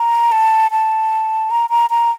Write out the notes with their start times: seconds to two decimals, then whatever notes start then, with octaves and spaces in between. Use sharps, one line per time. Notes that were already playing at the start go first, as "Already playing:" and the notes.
Already playing: A#5
0.32 A5
0.71 A5
1.51 A#5
1.70 A#5
1.90 A#5